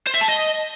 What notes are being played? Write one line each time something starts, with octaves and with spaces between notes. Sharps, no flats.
C5
E5
A5
D#5